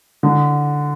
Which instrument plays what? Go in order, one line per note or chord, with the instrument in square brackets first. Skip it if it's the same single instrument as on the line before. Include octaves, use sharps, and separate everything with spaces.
[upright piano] D3